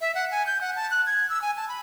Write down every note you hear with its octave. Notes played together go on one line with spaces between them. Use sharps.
E5
F#5
G#5
G6
F#5
A5
F#6
G#6
E6
G#5
A5
B5